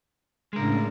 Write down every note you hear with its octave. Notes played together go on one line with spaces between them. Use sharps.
A2 C#3 G#3 D4 A#4